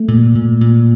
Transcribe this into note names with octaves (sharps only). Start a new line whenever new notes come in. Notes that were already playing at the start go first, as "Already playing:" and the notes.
Already playing: A3
A#2
A#2
A#2